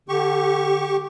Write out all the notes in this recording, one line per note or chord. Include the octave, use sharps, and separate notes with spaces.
D3 G4 C#6